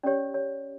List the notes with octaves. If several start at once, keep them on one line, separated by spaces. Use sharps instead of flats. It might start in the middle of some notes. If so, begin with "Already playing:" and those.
C#4 G4 C#5 D5
C#5